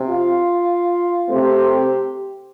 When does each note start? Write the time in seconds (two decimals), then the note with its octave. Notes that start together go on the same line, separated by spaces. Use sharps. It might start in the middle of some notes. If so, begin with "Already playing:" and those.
Already playing: C3
0.09 F4
1.29 C3 A3 C4 G4